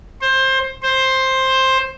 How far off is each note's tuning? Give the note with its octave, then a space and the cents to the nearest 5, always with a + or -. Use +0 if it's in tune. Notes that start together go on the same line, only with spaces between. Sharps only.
C5 +20
C5 +10